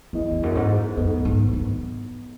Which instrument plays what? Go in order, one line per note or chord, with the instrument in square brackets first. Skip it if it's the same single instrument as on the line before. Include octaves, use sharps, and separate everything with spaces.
[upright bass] F#2 [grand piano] E3 B3 E4 G#4 D#5
[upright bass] E2
F#2
G#2
[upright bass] F#2 [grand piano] B3 D#4 A4
[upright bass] G#2
G#2